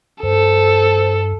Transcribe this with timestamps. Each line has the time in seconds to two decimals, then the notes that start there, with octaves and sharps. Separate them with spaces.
0.23 G2 A4 C5